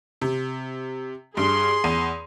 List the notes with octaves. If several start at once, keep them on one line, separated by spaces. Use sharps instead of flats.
C3
G2 G#4 C6
E2 D#7